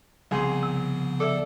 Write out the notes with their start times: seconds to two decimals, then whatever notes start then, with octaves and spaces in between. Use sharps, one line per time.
0.31 C2 C#3 F3 B3 G#4 C6
0.63 C3
1.20 A4 D5 E5 D6 E6